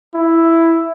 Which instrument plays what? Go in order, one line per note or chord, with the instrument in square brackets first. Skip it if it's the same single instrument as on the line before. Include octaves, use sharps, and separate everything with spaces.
[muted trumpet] E4